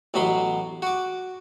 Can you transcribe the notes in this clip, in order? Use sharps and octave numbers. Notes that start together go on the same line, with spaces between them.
A1 B2 F#3 B5 C6
F#4 D6